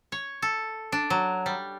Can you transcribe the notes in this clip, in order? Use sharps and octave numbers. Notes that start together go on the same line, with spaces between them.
C#5
A4
D4
F#3
G3